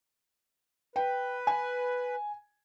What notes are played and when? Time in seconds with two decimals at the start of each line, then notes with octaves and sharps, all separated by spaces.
0.96 B4 G5
1.47 G#5